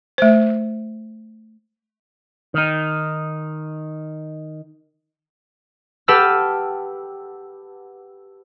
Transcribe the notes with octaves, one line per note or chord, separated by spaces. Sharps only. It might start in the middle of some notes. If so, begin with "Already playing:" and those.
A3 C5
D#3 D#4
G4 B4 F#5 A5 E6 F6